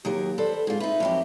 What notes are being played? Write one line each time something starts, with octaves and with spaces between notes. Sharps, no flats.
D#2 F#3 G4 A#4
A4 B4 C5 D5
G#2 F4 G#4
D#4 B4 E5
F2 F#3 G4